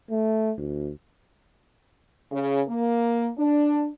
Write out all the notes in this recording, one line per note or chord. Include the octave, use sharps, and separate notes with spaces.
A3
D2
C#3
A#3
D4